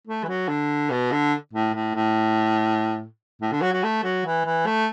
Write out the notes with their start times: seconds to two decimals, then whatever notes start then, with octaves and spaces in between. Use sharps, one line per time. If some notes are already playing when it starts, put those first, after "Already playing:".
0.07 A3
0.24 E3
0.28 F#3
0.48 D3
0.91 B2
1.12 D3
1.54 A2
1.74 A2
1.95 A2
3.42 A2
3.52 D3
3.62 F#3
3.73 F#3
3.84 A3
4.04 F#3
4.26 E3
4.45 E3
4.66 A3